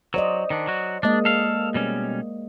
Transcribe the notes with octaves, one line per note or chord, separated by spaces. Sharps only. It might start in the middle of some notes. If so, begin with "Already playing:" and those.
F#3 C5 D5 D#5
D#3 D4
F#3 F#4
G#3 A#3 D4 D#5
A4 F5
B2 G3 C#4